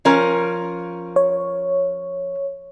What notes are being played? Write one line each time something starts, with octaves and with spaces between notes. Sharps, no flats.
F3 C#4 A#4
C#5